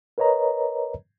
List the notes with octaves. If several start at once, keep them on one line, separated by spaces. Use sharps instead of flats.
A#4 B4 C#5 D#5 A#5